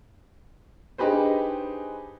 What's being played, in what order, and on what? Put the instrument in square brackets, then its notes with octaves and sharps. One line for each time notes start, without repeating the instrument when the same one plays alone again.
[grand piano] D4 D#4 G4 G#4 B4 C5